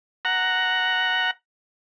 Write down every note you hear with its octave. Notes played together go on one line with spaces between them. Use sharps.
F#5 A#5